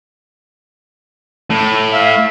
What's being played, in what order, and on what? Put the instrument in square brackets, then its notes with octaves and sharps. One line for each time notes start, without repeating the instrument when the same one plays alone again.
[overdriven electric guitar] A2
[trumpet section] E5 F5